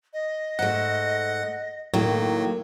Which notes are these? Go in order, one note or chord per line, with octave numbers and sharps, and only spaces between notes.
D#5
G#2 A3 F#5
A2 D#3 F#3 A#3